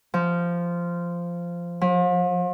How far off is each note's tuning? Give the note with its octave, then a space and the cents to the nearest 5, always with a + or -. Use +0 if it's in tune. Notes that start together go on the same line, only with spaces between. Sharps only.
F3 -10
F3 +40